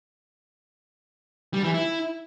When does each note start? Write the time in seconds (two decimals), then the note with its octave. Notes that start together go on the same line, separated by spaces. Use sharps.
1.54 G3
1.64 E3
1.74 E4